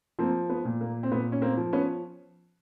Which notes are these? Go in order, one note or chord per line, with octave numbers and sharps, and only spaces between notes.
F3 A#3 C4
B3
A#2
A#3
C4
A#2 B3
C#4
A#3 C4
F3
B3 C#4